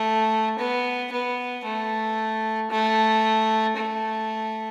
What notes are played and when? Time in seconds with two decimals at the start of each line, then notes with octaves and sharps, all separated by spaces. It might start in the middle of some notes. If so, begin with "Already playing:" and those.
Already playing: A3
0.59 B3
1.12 B3
1.64 A3
2.71 A3
3.76 A3